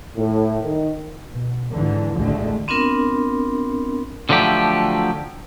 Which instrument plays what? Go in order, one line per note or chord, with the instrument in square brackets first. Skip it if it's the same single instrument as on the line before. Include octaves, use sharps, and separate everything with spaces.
[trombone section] A2
D#3
[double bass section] B2
G#2 D3 E3
A1 D#2 D3 G#3 A3
[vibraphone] B3 C4 D4 F4 A#4
[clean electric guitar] D3 F3 F#3 A3 G4